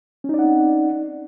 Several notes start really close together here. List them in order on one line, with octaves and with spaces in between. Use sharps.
C#4 D#4 D5 F#5 C4